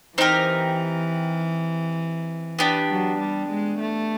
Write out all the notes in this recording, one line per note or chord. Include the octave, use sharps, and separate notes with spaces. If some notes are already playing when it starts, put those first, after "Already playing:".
E3 C4 D#4 G4 A#4
B3 D4 G4
F#3
G3
G#3
A3